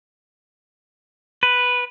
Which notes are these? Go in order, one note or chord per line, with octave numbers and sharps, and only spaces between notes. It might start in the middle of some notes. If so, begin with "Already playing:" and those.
B4